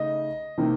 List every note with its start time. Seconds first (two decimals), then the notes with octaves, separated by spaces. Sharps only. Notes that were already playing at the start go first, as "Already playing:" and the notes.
Already playing: C#3 A3 D#4 D#5
0.58 C3 D#3 A#3 D#4